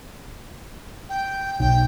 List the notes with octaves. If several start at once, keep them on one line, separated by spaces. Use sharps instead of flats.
G5
B1 G5